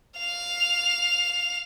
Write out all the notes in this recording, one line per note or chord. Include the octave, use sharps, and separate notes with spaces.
F5 F7